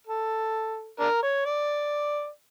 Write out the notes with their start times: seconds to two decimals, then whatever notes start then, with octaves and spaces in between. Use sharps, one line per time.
0.07 A4
1.00 D4 A#4
1.22 C#5
1.45 D5